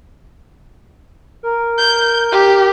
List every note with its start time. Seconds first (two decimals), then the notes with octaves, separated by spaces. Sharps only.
1.43 A#4
1.78 G6
2.32 G4